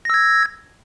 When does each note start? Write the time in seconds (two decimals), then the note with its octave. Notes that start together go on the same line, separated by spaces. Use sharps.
0.05 A#6
0.10 E6
0.14 G#6